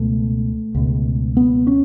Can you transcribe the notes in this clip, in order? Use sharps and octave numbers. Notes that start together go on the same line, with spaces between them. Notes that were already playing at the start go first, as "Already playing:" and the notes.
Already playing: C#2 B2 A3
C#2 B2
B3
C#4